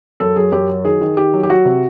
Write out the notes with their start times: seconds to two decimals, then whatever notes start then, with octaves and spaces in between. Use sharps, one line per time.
0.20 F#2 A4
0.36 F#3 G#4
0.52 F#2 G4
0.69 F#3
0.84 D#3 G#4
1.01 D#3
1.17 D#3 G4
1.34 F#3
1.43 G4
1.49 F#3 F#4
1.65 C3